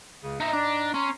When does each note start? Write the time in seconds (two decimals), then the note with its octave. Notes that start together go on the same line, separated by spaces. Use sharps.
0.23 C#2 C#3
0.40 G#2 D#4 D#5 E5 A#5
0.53 D4
0.94 C#4 A#5 C6